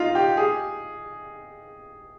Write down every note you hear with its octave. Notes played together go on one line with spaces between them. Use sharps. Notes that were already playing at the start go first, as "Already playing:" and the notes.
Already playing: D#4 F4
G4
G#4